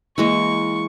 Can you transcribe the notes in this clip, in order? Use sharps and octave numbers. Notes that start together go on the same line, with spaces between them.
E3 G#3 A#3 C#6